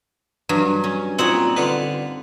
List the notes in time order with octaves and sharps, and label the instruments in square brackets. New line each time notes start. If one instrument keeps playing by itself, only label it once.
[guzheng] G2 F#3
C#4
[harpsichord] A#2 F#5 [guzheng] C4 D#4 C#5
[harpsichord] D3 F4 B4